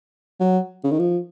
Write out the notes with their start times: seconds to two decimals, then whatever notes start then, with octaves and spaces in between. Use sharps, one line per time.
0.40 F#3
0.84 C#3
0.91 D#3
0.99 F3